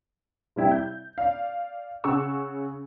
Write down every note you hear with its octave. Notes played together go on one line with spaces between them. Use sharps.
C3 G3 E4 G4
G6
D5 F5
C#3 F#5 C#6 E6